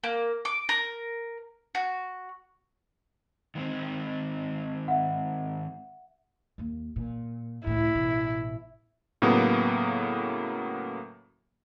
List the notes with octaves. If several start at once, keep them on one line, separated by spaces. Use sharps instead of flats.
A#3
D6
A#4
F#4
D#3 G#3 C4
E5 F#5
D#2 A#3
A#2
C#2 A2 E4
A1 B2
A2 C#3 F#3 A#3 B3